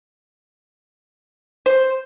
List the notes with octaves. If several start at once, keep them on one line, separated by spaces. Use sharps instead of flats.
C5